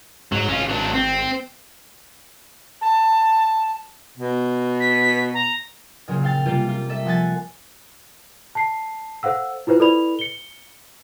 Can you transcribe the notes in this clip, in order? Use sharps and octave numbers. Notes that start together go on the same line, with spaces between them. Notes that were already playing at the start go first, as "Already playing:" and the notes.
G#2 F#3
G#1 C#4 F4
F#3 D4
C4
A5
B2
B6
A#5
A#2 C#3 F#3
F5 G5 A6
C3 G3 A#3 F4 G4
F4
A4 E5
F3 F#5 G#5 A6
A5 C7
A4 C5 F5 F#5 E6
E4 F4 B4 C5
E4 A4 B4 D5 B5 F7
C#7 G7